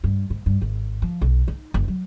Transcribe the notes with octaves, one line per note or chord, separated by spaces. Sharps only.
G2
G#2
G2
G#1
F3
B1
D#4
F#1
F#3